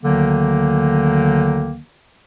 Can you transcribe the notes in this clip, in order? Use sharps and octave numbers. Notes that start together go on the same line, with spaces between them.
D2 D3 D#3 F#3 A#3